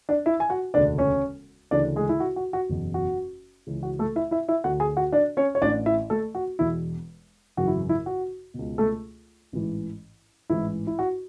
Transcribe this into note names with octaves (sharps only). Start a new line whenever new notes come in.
D4 D5
E4 E5
G#5
F#4 F#5
E1 D2 C#3 D4 D5
C#4 C#5
D2 C#3 E3 D4 D5
G#3 G#4
E4
F#4
F#4
F#4
F#1 E2 B2
F#4
C#2 C#3 E3
F#4
A3 A4
E4 E5
E4 E5
E4 E5
D2 D3 F#4 F#5
G#4 G#5
F#4 F#5
D4 D5
C#4 C#5
C#5
A1 A2 E3 D4 D5
E4 E5
A3 A4
F#4
E1 E2 B2 E4
G#1 F#2 C#3 E3 F#4
E4
E4
F#4
C#2 B2
A3 A4
A1 G#2 E3
A1 G#2 E3 E4
E4
F#4